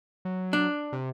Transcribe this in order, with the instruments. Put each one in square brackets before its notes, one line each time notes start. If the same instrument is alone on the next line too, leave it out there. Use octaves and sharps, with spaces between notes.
[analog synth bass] F#3
[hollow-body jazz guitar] D4
[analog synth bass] C3